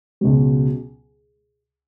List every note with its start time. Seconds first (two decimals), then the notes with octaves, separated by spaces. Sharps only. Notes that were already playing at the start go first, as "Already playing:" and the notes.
0.21 C#2 B2 F#3